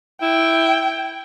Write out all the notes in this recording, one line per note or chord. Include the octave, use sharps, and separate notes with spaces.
E4 G5